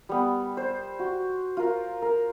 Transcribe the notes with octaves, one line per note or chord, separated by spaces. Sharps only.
G3 B3
C5
F#4
F4 A#4
A#4